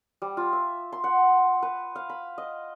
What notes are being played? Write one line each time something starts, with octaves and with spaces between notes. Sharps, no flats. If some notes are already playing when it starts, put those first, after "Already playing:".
G3
F4
E5
C6
F#5
B4
F5
B5
D#5